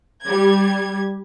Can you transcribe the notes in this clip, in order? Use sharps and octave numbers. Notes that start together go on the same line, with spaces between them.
G3 G#6